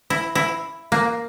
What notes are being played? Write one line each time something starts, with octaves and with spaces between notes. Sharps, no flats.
E4
E4
A#3